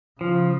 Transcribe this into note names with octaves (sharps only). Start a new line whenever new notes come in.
C#3 F3